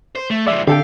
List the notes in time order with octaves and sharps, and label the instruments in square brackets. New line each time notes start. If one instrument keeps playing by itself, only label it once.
[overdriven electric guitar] C5
A3
[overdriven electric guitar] F3 G#3 [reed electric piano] D5 E5
[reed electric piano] D3 [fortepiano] G4 A4 G5 [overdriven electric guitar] F5